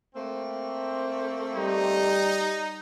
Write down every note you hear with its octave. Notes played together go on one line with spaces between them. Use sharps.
A3 A#3 C4
G3 D#4